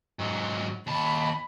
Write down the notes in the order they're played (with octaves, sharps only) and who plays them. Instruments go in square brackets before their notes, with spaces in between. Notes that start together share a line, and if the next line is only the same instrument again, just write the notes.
[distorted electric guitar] G#2 F#3
[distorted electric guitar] D#2 A5 [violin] B5